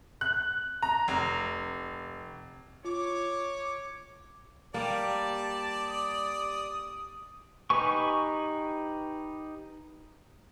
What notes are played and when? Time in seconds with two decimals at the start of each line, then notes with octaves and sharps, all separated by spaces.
0.21 F#6
0.82 A#5
1.08 F1
2.85 F4 C#5 D6
4.74 G3 A#3 D5 A5
5.88 D#6
7.70 D#4 G4 B4 G#5 C#6